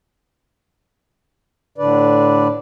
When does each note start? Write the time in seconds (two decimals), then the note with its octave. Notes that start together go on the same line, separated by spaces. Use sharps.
1.78 A2 D3 D4 B4 D5